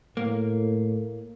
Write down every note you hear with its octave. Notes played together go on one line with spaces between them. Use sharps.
A2 A#3